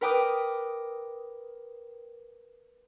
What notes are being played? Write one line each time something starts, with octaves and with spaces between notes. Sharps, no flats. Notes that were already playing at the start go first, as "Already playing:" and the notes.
A#4 B4 G5 D6 D#6